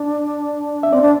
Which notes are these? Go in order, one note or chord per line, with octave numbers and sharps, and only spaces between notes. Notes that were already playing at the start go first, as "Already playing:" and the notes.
Already playing: D4
E5
C4 D5
D4